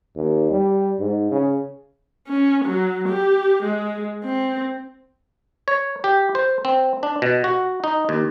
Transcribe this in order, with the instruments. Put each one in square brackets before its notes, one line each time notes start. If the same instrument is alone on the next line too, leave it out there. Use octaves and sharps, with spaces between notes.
[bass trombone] D#2
G3
G#2
C#3
[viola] C#4
F#3
G4
G#3
C4
[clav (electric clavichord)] C#5
G4
C5
C4
D4
B2
F#4
D#4
D#2